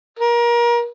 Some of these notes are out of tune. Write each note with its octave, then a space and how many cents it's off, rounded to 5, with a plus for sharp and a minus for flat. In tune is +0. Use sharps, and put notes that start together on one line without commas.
A#4 +30